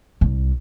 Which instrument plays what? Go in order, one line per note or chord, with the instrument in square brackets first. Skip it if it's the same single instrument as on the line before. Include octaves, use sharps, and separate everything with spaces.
[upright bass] C2